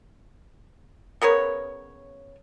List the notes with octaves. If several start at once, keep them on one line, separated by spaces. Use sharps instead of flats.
C#3 B3 A#4 C#5